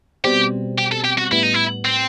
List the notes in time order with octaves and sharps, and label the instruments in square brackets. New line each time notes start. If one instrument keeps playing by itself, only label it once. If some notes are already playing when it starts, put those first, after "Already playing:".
[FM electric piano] B2 G3 C4 [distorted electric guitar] G4
[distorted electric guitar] G4
A4
G4
F#4
[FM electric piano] A2 G3 B3 [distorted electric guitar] E4
[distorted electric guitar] D#4
E4
C4